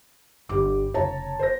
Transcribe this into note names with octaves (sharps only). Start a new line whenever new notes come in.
G1 G3 D6
F1 C#3 C#5 A5 A#5
C5 A#6